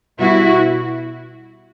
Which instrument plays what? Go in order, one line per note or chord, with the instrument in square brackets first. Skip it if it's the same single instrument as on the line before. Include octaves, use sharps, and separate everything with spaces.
[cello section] B2 G3 B3 E4 F#4